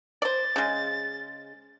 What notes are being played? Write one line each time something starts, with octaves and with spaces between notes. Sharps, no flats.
C5 D5 A6
C#3 G#3